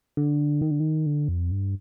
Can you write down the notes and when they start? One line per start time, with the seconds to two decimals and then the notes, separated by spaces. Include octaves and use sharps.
0.17 D3
0.62 D#3
0.71 D3
0.80 D#3
1.06 D3
1.28 F2
1.51 G2